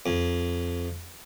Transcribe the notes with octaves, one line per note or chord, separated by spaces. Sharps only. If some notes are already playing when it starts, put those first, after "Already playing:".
F2